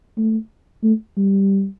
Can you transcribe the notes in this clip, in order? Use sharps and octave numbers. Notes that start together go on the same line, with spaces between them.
A3
A3
G3